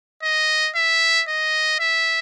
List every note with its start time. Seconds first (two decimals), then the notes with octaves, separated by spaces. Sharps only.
0.23 D#5
0.76 E5
1.28 D#5
1.80 E5